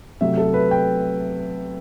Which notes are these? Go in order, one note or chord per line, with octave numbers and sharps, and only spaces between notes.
C3 F#3 A3 E5
A4
B4
G5